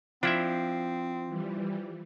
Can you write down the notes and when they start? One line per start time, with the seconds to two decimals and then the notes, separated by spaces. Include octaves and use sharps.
0.23 F3 C4 D4 E4 E5
1.28 E3 G3